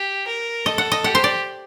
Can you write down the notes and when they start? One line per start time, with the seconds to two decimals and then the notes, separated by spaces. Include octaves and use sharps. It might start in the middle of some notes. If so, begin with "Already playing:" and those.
Already playing: G4
0.27 A#4
0.66 A4 D#5
0.78 F#5
0.92 D#5
1.04 G4 F#5
1.15 C5
1.24 D5